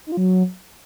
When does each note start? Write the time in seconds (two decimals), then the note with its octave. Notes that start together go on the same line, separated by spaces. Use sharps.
0.07 D#4
0.12 F4
0.17 F#3